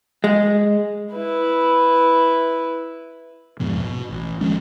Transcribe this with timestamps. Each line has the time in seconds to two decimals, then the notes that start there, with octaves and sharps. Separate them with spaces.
0.24 G#3
1.13 E4 B4
3.60 E1 G#2 B2 F3
3.77 B2
4.11 A1
4.41 D#3 F3 G#3 C#4